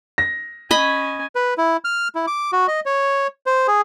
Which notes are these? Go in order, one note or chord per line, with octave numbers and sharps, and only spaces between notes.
A#6
C#4 D#5 G#5 B5
B4
E4
F6
E4
D6
F#4
D#5
C#5
C5
G#4